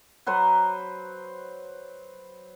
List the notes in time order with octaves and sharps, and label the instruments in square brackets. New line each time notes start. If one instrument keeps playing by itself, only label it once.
[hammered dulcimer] F#3 B4 C5 C#6